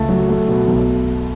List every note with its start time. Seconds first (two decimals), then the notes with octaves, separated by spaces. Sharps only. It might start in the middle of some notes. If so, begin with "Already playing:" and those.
Already playing: C#2 A3 A5
0.09 F#3
0.29 A3
0.48 B2
0.68 B1